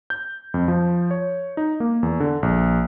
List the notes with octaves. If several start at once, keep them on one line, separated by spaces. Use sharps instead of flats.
G6
F2
F3
C#5
D#4
A#3
E2
D3
A#1